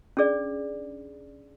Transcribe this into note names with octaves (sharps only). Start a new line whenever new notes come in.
C#4 D4 G#4 D5